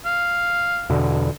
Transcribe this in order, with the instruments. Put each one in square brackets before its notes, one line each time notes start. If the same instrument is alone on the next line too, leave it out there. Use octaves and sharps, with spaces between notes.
[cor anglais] F5
[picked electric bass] E2 B2 D3